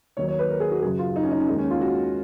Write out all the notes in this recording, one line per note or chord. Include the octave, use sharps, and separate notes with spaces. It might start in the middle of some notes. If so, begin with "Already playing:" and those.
D#2 D#3 F#3 C#5
C#5
B4
A#4
G#4
F#4
F#2 C#3 F#3 G#4
F4
D#4
C#4
D#4
C#4
D#2 D#3 G#3 D#4
C#4
F4
F#4